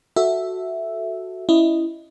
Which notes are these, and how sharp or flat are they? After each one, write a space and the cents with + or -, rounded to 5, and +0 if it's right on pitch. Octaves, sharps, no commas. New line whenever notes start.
F#4 +0 A4 +0 E5 +0
C#4 +0 E4 +0 D#5 -5